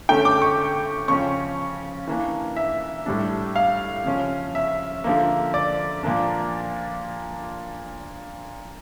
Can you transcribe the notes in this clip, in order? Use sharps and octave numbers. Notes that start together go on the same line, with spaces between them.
D3 A3 C#4 G5
D6
C#6
C#3 F3 C#4 C#6
E3 A#3 D4
E5
A2 G3 D4
F5
C#3 F3 C#4
E5
D3 F3 A#3
D5
A#2 F3 A#3 D4